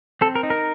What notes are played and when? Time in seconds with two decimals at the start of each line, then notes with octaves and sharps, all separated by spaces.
0.21 C4 A4
0.35 A#4
0.43 D#4
0.50 A#4